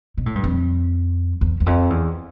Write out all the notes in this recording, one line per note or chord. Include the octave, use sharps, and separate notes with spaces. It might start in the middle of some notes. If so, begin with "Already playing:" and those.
B2
A2
G2
F2
E2
E2
F2
E2